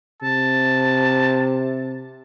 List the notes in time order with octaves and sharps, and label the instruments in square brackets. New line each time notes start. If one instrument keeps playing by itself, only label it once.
[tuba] C3 [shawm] A5